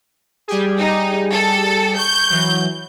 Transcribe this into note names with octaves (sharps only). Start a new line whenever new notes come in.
G3 G4 G#4
D#4
A4
C#6 G6
E3 F#3